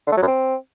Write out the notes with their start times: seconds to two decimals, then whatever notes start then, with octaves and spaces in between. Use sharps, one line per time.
0.07 D3
0.12 A3
0.17 F#3
0.22 F#2
0.27 C4